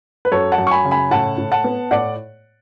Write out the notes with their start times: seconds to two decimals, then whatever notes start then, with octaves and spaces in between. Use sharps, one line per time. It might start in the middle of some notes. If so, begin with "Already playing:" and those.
0.25 B4
0.32 F#2 A4 C#5
0.52 F#5 A5
0.58 F#2
0.67 C#6
0.71 G#5 B5
0.85 C#3
0.91 G#5 B5
1.11 A2 F#5 A5
1.38 A2
1.52 F#5 A5
1.64 B3
1.91 A2 D5 F#5